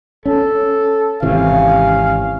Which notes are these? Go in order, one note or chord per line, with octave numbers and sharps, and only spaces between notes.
C#4 A4
G#1 C3 E3 C#4 F5